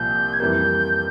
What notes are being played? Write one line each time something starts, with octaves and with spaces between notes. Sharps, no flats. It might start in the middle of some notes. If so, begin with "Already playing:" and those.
Already playing: C2 A#2 F3 G6
G#6
F2 E3 G3 A#3 G6